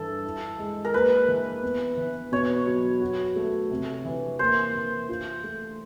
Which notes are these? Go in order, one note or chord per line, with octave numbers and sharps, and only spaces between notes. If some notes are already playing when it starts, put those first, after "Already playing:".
Already playing: G2 E3 A4
E4
G#3
A#4
A#3 B4
E3
B3
E3
B2 C#5
F#3
F#4
A3
C3
E3
A#3 C5
E3
F4
A3